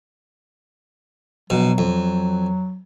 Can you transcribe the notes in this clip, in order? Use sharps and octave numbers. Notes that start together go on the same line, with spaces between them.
A#1 B2 F#3
F2